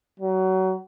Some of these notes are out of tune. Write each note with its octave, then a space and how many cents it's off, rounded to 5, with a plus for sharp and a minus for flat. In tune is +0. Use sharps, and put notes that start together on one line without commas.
F#3 +25